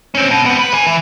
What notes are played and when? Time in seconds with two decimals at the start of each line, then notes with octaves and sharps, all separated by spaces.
0.15 C4 C#4
0.31 B2
0.46 B3 C4
0.59 B4
0.73 B4 G#5
0.87 E3